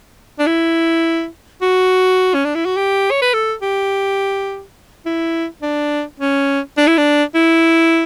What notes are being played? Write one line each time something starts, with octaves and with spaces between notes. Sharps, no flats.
D4
E4
F#4
C#4
D4
E4
F#4
G4
C#5
B4
A4
G4
E4
D4
C#4
D4
E4
D4
E4